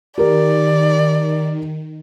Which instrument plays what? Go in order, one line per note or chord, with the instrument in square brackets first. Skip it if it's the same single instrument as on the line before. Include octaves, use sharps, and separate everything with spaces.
[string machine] D#3 [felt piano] G4 A#4 [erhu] D5